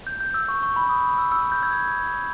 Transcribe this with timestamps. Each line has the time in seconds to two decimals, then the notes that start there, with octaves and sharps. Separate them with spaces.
0.07 G6
0.20 G6
0.34 E6
0.48 C#6
0.63 C#6
0.76 B5
0.83 E6
0.89 D#6
1.18 E6
1.32 E6
1.42 E6
1.52 G6
1.63 E6 G#6
1.73 G6